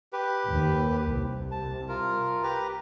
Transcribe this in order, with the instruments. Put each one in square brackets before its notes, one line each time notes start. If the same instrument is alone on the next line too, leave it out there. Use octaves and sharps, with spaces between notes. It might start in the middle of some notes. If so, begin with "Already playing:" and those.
[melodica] G4 B4
[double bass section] D#2
C2 C3
[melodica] A5
F4 A#4
G4 B4 A#5